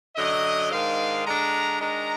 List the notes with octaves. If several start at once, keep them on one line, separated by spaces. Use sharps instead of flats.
F#2 D3 F#3 D#5
G#2 D#3 G#3 D4 F5
D3 G#3 D4 A#5
D#3 G#3 D4 A#5